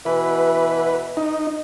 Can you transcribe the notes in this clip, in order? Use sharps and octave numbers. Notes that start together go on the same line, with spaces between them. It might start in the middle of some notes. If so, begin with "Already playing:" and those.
B2 E3 B4
D#4